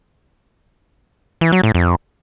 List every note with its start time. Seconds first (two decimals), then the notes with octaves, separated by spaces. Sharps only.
1.41 E3
1.52 F#3
1.63 A2
1.75 F2